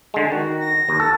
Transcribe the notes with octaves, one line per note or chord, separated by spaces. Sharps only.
D3 G#3
D#3 F#4
A#6
D#2
A4